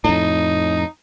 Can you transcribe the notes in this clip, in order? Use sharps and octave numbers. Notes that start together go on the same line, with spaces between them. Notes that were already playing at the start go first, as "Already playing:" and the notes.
F2 A2 D#4